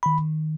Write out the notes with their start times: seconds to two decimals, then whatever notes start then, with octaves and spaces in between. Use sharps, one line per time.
0.03 D#3 B5